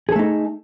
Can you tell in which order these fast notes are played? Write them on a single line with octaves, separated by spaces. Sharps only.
G#4 A4 A3 D#4